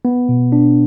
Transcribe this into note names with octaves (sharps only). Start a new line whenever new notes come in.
B3
B2
D4